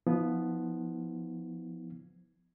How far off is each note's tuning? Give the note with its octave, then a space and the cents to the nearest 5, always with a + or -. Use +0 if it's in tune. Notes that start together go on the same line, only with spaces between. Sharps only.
F3 +0 B3 +0 E4 -45